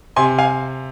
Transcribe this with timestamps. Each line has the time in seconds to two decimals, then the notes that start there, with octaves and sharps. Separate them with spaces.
0.16 C3 G#5 C6
0.38 F5 G#5